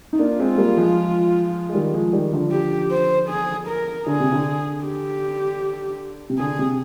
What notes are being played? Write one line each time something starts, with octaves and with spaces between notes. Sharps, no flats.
D#4
A#3 D4 F4
G#3 C4
G3 A#3
F3 G#3
G#3
D#3 G3
F3 G#3
D#3 G3
D3 F3
G4
C5
G#4
A#4
D3 G#4
C3
D3
G4
C3
D3 G#4
C3